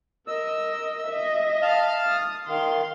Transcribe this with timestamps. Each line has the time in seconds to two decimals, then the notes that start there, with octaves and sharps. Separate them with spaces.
0.27 A#4 D#5 E6
1.06 D#5 E5
1.62 F5 A5 F6
2.07 D#6
2.47 D#3 F5 C6